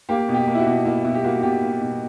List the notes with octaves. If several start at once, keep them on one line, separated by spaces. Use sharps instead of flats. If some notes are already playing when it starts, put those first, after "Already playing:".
A#3 G4
B2
G4
A#3
E4
F#4
B2
A#3 E4
B2 E4
G4
A#3 F#4
B2 G4
A#3
B2